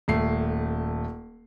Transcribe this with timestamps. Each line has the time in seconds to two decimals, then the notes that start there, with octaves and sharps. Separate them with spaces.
0.08 D#1 A3 C7